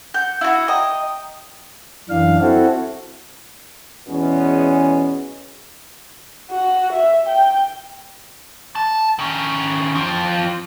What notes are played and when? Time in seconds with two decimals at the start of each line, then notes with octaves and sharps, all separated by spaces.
0.14 F#5 G6
0.41 E4 F#4
0.68 D#5 G5 A#5 D#6
2.10 F#2 E3 D4 F5
2.41 C4 E4 F#4 A4
4.08 E2 B2 G#3 C#4
6.51 F#4
6.92 E5
7.27 G5
8.75 A5
9.19 D#3 C#4
9.94 F2 F3